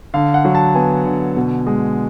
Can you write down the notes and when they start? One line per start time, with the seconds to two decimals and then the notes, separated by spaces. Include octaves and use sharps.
0.14 D3 F5
0.34 F#5
0.45 F#3
0.55 A5
0.75 B3 G#5
1.06 D3
1.36 B2
1.67 G#3